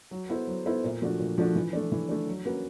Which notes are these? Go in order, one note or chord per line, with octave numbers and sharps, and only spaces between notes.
F#3
B3 E4 A4 C5
F#3
B3 E4 A4 C5
A#2
F3 A3 D4 F#4
A#2
F3 A3 D4 F#4
E3
A3 D4
E3
A3 D4
F#3
A#3 C#4 F#4 B4